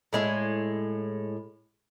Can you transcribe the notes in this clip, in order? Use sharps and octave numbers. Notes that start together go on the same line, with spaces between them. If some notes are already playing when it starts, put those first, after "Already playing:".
A2 G#3 E4